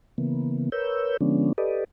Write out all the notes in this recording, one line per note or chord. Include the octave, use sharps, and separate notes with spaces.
C#3 E3 A#3 B3
A#4 B4 C#5 E6 G6
D3 F3 G#3 B3 C#4 D4
G4 A4 B4 D5 D#5